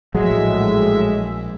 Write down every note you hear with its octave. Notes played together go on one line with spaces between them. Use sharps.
A#1 A2 F#3 G#3 E5